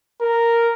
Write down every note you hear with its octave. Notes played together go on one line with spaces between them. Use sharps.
A#4